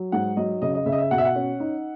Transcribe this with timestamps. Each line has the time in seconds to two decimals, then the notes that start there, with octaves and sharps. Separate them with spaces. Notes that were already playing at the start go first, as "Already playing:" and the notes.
Already playing: F#3
0.12 G#2 F#5
0.37 F#3 D#5
0.62 C#3 D#5
0.74 D#5
0.86 C#3 E5
0.92 D#5
0.98 E5
1.11 B2 F#5
1.18 E5
1.25 F#5
1.35 C#4
1.60 D#4